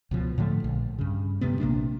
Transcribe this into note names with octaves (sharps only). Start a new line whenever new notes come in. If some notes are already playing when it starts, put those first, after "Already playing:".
C#2 B2 F3
A2 D3 F3 A3
A#1
G2 C#3
D2 C3 G3 B3
A#1 C3 A#3 D4